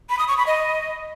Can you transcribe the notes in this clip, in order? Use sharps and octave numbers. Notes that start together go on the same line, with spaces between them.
B5
D#6
C#6
B5
D#5